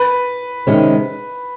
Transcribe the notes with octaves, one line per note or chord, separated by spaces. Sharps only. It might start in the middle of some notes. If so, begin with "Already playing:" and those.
Already playing: B4
C3 D#3 G#3 C#4